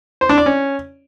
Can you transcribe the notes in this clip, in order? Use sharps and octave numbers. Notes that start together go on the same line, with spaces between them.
C5
D4
D5
C#4